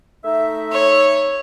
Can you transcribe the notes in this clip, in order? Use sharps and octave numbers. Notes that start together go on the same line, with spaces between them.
A3 D#4 E5
C#5